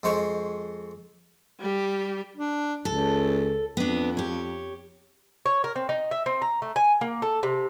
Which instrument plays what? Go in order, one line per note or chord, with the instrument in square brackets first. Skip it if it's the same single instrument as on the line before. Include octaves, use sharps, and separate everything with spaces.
[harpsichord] F2 G#3 C5 C#6
[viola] G3 G4
[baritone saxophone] D4
[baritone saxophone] C#2 [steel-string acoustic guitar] A4
[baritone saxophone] F2 [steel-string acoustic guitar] B3 D4
[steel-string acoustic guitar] G4 C#5
[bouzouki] C#5
A#4
C4
D#4
E5
C4
A#5
A3
G#5
A#3
A4
C3